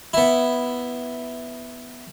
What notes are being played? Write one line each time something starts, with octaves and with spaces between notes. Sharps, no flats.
B3 E4